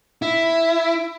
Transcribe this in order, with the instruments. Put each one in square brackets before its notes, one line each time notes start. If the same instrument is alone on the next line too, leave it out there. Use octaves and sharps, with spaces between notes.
[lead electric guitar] E4